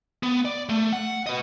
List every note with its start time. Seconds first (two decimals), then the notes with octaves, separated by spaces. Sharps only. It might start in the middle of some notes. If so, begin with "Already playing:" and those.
0.23 B3
0.45 D5
0.69 A3
0.93 F#5
1.26 B4 D#5